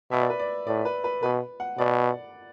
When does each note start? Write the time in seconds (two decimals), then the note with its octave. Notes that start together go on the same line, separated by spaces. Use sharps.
0.11 B2 E5
0.20 D5
0.30 B4
0.39 D5
0.67 A2 D5
0.85 B4
1.04 B4
1.23 B2 B4
1.60 F#5
1.78 B2 D5